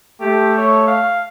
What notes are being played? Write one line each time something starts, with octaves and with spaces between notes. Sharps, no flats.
A3 G4
C#5
F5